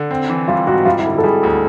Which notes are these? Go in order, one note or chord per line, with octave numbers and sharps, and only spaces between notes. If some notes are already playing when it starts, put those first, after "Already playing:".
Already playing: D3
C4
E3
G3 F4
G#2 F#4
G3 F4
E4
D3
F#4
A4
G3 G#4
D2